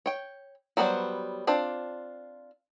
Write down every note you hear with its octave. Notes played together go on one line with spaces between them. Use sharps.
C#5 G5
F#3 G3 B3 D4 C5
C4 D4 F4 C5